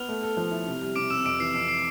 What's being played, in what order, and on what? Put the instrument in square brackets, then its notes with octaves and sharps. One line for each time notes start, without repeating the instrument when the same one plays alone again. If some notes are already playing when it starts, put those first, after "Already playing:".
Already playing: [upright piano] B3 [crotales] F6 F7
[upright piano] A3
A4
F3
E4
C3
G3
[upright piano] C3 [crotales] D6 D7
[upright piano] C3 [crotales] E6 E7
[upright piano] F2 [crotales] D6 D7
[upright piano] E3 [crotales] C7
[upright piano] F2 [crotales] C7
[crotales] C7